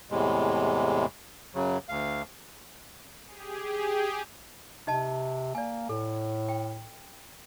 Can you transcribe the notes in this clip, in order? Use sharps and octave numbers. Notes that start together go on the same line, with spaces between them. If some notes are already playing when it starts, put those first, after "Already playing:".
E2 A2 C3 G#3
F#2 C#3 F#3
D2 F5
G4 G#4
C3 D#4 D#5 A5
A#3 D5 G#5
A2 A4
G5